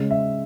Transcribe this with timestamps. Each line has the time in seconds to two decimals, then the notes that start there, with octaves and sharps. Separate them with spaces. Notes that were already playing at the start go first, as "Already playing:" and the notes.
Already playing: C#3 G#3
0.11 E5